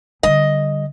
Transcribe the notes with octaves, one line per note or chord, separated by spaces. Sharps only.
D3 G3 D#5